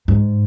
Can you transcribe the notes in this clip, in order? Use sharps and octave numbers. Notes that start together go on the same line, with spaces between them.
G#2